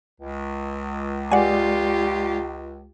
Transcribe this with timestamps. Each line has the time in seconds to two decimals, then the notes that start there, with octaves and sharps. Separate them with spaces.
0.20 C#2
1.32 G#3 F4 G4 D5 F#5 G#5